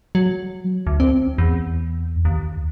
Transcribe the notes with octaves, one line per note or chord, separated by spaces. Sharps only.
F#3
D2
C4
E2
D#2